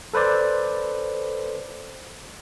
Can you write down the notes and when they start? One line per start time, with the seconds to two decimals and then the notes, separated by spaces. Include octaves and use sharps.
0.13 A4 B4 C5 D5